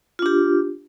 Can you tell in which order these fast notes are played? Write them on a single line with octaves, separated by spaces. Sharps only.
F4 D4 G4